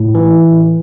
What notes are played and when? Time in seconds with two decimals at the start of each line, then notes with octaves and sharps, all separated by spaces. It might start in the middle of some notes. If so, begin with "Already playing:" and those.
Already playing: A2
0.15 E3